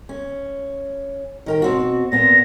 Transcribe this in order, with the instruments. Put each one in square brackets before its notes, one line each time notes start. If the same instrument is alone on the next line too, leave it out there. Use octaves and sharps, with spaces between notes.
[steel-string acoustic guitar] C#4
D#3 A#4 G5
B2 C4 F#4
[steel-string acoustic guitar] A#2 B3 C4 [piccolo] A#6